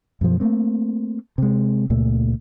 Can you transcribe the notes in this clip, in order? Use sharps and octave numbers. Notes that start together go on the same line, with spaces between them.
F#2 B2 F3
A3 A#3 C4
C3 G#3
C#2 A#2 A3